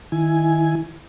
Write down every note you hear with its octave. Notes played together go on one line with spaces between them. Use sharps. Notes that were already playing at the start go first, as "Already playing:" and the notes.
D#3 E4 G#5